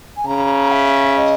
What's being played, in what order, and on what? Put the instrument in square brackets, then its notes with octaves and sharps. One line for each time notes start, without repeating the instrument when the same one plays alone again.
[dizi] G#5
[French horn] C#3 [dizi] A#5
[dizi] E5
D#5